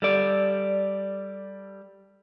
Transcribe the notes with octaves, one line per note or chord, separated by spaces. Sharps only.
G3 A4 D5